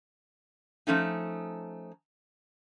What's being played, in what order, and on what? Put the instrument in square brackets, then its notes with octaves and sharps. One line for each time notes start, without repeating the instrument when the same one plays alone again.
[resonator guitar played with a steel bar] F3 A3 C#4 D#4